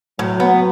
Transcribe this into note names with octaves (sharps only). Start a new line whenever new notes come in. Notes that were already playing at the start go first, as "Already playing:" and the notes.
A2 F#3
B3